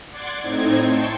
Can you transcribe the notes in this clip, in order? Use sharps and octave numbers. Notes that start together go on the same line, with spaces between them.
D5 F#5 C6 D6 G#6 A6
A2 C4 D#4 G#6
G5 A5 C6 C#6 C#7